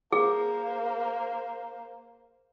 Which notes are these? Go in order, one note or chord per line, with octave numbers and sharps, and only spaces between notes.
A#3 G#4 C5